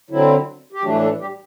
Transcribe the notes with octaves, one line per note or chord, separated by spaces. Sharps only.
D3 F#3 C4 E4
G4
A2 E3 F#3 A3 D4 F#4
A3 A4
G3 G4